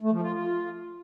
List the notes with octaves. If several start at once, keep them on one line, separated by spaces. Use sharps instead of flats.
A3
F3
F4
F4